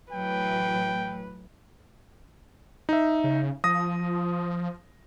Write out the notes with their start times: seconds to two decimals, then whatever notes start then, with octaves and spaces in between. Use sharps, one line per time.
0.13 A2 E3 F#3 B4 G5
2.89 D#4 E5
3.24 C#3
3.64 F3 D#6 A#6